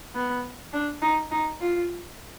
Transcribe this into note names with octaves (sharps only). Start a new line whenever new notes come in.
B3
D4
D#4
D#4
F4